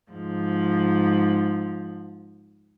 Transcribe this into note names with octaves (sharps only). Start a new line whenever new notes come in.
G#2 F3